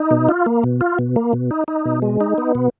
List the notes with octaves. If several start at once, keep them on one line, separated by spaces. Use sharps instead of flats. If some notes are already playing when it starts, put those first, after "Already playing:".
Already playing: D#4
B2
F4
A#3
B2
F4
B2
A#3
B2
D#4
D#4
B2
G#3
D#4
B3
B2